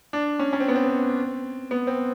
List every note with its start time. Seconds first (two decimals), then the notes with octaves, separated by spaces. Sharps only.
0.13 D4
0.39 C#4
0.53 C#4
0.60 C4
0.68 B3
0.75 C4
1.71 B3
1.87 C4